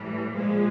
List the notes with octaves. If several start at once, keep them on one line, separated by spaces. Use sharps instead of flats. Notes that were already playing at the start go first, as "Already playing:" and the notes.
Already playing: A2 E3 G3
A#2 F3 G#3